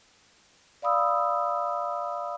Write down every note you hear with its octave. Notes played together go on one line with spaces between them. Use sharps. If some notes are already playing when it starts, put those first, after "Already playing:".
D5 F5 B5 D#6 E6